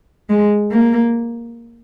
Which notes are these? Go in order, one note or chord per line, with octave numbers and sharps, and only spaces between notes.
G#3
A#3